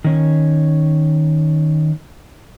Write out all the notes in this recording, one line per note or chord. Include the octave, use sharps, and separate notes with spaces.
D#3 C#4